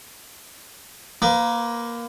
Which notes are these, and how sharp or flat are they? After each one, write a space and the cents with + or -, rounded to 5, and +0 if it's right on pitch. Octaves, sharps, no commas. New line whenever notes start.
A#3 +10 B4 +35